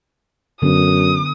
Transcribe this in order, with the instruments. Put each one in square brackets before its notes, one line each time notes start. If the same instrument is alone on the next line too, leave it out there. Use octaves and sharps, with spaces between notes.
[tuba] F#2 [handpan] D3 B3 [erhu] D#6